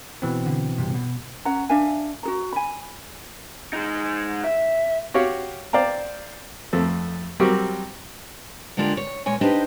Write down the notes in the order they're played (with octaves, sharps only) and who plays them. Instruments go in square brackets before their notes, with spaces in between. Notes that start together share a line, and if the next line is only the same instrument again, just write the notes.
[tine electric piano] B2 E3 C4
[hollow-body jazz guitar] D3
G2 C3
B2
[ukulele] C#4 F#5 A#5
D4 E5 F5 G#5
F#4 G#4 A#5
G#5 B5
[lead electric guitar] G#3 D#4
E5
[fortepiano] F#4 G4 C#5 F5
C5 D5 F5 G5 A#5
F2 A3 A4
F#3 G3 C4 F#4 G4 A#4
[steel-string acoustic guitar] D3 G#3 A#3 D4 F4 G4
C#5
A#2 G#3 C#5 G#5
D4 D#4 G4 B4 C5 D#5